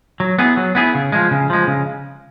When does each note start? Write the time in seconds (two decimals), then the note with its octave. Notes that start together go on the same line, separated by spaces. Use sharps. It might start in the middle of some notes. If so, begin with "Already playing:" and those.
0.20 F#3
0.39 B3 E4 G#4
0.57 F#3
0.75 B3 E4 G#4
0.95 C#3
1.12 F3 G#3
1.31 C#3
1.50 F3 G#3
1.67 C#3